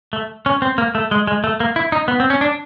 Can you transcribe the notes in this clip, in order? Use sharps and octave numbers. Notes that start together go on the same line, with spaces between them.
A3
C#4
C4
A#3
A3
G#3
G#3
A3
A#3
E4
D#4
B3
C4
C#4
D4